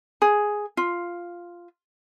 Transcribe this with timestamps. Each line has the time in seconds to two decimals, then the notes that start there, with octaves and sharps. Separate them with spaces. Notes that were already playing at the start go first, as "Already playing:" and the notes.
0.22 G#4
0.77 F4